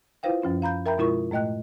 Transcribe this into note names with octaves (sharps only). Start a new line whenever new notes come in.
E4 F4 B4 C5 F5 G5
F#2 F3 C#4 F4
F5 A#5 B5 G6
A#4 E5 G5 A#5 B5 G6
B2 G#3 E4 F4 A#4 C#6
A2 A3 D#5 G5 F#6